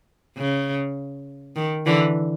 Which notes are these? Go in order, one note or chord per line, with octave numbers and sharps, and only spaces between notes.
C#3
D#3
D3 E3